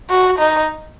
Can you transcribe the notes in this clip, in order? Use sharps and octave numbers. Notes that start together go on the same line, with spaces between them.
F#4
D#4